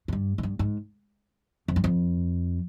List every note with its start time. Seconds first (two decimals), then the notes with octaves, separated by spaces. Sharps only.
0.08 G#2
0.13 G2
0.38 G#2
0.43 G2
0.59 G#2
1.68 F2
1.76 G2
1.84 F2